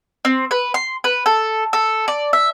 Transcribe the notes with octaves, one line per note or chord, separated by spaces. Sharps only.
C4
B4
C6
B4
A4
A4
D5
E5